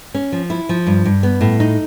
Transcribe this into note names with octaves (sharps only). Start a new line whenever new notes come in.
C#4
F3
E4
F3
G2
G2
B3
A2
D#4